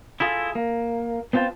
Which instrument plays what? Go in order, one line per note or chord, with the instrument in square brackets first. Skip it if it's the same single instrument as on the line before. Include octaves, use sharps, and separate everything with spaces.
[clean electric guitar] E4 F4 G#4 A4
A#3
B3 C4 F4 G5 A5